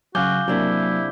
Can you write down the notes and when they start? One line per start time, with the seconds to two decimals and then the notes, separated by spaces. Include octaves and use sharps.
0.15 C#3 F#3 F#4 F5 G#5 D6 G6 G7
0.48 C3 F#3 A#3 D4 E4